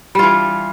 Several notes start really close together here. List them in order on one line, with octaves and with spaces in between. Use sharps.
G3 F4 E3